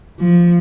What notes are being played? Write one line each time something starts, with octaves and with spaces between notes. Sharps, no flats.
F3